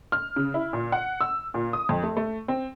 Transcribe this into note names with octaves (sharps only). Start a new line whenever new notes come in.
F6
C#3
E4
A#2
F#5
E6
A#2
D#6
F2
A3
A3
C4